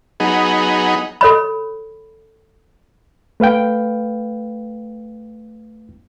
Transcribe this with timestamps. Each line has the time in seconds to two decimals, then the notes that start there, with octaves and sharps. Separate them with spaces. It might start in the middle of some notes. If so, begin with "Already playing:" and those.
0.20 F#3 B3 D#4 G#4
1.21 A4 C#5 B5
3.40 A3 B4 F5 G5